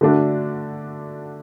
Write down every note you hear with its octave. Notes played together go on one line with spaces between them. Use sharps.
D3 A3 D4 F#4